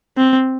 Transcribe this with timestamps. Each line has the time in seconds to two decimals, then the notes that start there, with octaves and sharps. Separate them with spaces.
0.17 C4